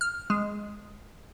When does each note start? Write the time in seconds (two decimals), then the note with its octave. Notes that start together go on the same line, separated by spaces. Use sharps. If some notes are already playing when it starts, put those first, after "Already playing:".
0.01 F6
0.30 G#3